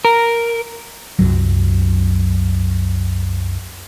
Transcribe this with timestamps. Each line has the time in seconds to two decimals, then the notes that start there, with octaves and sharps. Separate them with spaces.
0.05 A#4
1.19 C2 F#2 F#3